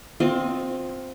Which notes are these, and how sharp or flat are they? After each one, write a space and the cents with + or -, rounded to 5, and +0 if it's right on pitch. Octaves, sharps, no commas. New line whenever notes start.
C4 +0 F4 +25 D#5 +0